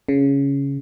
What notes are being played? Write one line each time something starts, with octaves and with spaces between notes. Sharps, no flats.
C#3